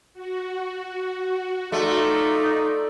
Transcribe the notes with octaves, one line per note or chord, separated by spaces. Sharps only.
F#4
A3 D#4 F4 D5